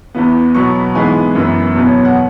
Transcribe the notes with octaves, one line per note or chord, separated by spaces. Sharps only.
E2 E3 B3
B2 F#3 B3 C#6
B5
G#2 E3 G#3 B3 G#5
F#2 E3 B3
E2 B2 F#3 B3
C#5
F#5